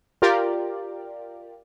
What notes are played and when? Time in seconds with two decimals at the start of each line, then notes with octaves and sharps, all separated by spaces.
0.22 F4 G4 A#4 D5